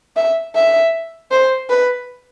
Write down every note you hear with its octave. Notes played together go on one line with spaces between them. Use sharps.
E5
E5
C5
B4